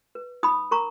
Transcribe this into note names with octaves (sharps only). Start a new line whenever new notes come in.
B4
D#4 B5 D#6
A#4 A#5 C#6